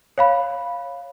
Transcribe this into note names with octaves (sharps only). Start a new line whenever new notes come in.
C#5 F5 B5